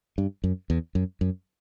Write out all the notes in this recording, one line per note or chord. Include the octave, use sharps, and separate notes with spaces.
G2
F#2
E2
F#2
F#2